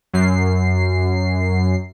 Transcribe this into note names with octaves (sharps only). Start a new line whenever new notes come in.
F#2 C7